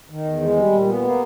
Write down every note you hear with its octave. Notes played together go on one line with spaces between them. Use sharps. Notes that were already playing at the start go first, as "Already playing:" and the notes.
D#3
E2
G#3
G3
A#2
B3
A#3